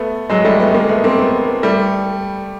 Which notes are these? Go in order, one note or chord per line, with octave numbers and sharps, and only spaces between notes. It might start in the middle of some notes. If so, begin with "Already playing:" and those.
Already playing: A3 B3
F#3 G#3
G3 A3
A3 B3
G#3 A#3
A3 B3
A#3 C4
A3 B3
G3 A3